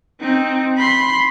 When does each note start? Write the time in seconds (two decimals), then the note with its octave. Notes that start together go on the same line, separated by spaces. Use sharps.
0.21 C4 D#4
0.77 B5 C6